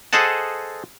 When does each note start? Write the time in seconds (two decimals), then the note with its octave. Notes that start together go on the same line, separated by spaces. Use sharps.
0.13 G#4 A4 C5 D#5 F#5 A5